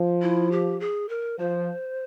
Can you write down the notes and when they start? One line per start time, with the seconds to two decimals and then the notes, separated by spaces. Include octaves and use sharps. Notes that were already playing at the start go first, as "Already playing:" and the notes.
Already playing: F3
0.22 E4
0.52 G4
0.80 G#4
1.09 A#4
1.39 F3 C5